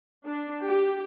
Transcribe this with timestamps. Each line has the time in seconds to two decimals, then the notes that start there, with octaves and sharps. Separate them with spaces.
0.25 D4
0.62 G4